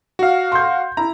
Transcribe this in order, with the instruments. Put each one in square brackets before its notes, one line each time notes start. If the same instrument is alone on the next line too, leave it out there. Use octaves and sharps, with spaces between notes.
[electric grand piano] F#4 F5
[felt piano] C6 G6
[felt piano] E4 [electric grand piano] A#5